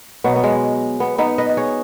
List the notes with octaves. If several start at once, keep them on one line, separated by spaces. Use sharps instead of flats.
B2 F#3 B3
B3
G#3
B3
B3 D#4
B4 D#5
D#5
G#4 C#5